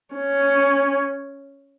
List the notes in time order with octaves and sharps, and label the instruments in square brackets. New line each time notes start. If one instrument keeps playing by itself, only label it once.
[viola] C#4